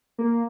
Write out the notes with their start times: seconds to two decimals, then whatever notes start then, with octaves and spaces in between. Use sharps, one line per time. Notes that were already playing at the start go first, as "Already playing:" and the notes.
0.18 A#3